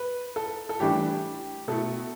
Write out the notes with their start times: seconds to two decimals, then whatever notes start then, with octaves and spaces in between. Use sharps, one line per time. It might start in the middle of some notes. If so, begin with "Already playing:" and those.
Already playing: B4
0.36 A4
0.69 A4
0.80 A2 E3 G3 D4 G4
1.68 B2 A3 E4 A4